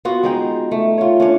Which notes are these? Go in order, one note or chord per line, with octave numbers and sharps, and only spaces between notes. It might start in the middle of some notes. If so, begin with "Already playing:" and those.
B3 F4 F#4
G#3 D#4 G5
A3
F4 C#5
C#4 D4 C#5